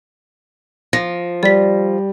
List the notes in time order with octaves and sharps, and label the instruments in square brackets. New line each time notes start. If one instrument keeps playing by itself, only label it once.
[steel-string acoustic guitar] F3 [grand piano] A#6
[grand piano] G3 [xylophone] D5 B6